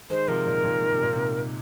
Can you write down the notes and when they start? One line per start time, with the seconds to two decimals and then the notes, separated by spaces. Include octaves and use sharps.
0.10 D#3 G#3 C5
0.28 C3 F3 A#4
0.46 A#2 D#3
0.64 A#2 D#3
0.82 D#3
0.92 C3
1.03 A#2
1.13 G#2 C3